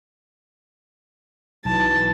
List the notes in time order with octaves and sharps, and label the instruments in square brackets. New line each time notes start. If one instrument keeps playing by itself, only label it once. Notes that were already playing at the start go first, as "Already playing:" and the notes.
[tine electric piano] B1 [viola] E3 A5